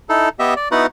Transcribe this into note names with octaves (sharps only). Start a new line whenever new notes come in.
D#4 E4 A4
B3 G4 D#5 E5
D5
B3 D#4 E4 F#4 B4 F#5